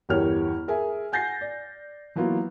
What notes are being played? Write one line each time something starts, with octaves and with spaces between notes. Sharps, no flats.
G1 E2 G4 A#4 C#5 F6
G#4 A#4 E5 G#5
F#5 G#5 G6 A6 A#6 C7
D5
E3 F#3 A#3 B3 F4